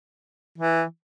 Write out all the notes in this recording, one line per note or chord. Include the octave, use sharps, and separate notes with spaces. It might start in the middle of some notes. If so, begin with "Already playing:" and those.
E3